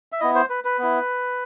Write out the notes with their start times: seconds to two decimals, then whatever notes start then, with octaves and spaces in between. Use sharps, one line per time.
0.12 E5
0.20 B3 E4 D#5
0.35 C5
0.50 B4
0.65 B4
0.79 B3 E4